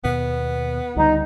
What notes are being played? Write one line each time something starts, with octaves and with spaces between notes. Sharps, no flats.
D#2 B2 B3
C#2 D3 G3 D#4